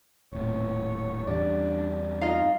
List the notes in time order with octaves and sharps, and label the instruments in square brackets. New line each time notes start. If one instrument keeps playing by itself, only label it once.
[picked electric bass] D#1 A2 [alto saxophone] C#5
[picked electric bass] E2 G2 G3 [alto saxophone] D4 [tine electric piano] D5 A6
[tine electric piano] D#4 [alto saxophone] F4 [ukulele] D#5 F5